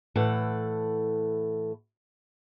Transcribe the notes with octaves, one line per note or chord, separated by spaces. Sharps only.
A2 E3 A4 F#5